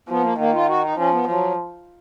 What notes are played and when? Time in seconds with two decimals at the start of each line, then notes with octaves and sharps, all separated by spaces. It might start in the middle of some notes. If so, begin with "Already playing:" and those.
0.09 F3 B3
0.23 A#3
0.38 D#3 A#3
0.53 F4
0.68 F#4
0.82 D#4
0.97 F3 C#4
1.12 B3
1.27 F3 F#3